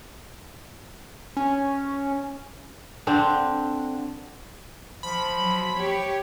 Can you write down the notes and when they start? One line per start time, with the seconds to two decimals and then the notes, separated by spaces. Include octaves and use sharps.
1.37 C#4
3.07 D3 C4 D4
5.03 F3 B5
5.39 F#3
5.76 G4 C#5